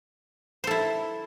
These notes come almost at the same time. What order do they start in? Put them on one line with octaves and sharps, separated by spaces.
C5 A4 E4